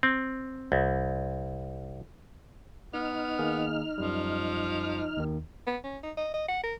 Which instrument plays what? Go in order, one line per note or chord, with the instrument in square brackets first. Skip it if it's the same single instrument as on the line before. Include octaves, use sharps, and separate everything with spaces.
[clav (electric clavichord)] C4
C2
[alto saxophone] B3 [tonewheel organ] D#4 F6
[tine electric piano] D#3 A#3 G#4
[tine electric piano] F#2 G3 [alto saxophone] F3
[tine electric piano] D#2 D#3
[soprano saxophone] B3
C#4
D#4
D#5
D#5
F#5
A#4